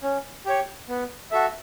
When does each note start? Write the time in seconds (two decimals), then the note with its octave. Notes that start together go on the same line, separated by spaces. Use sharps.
0.02 C#4
0.46 G4 C#5
0.89 B3
1.31 F#4 A4 E5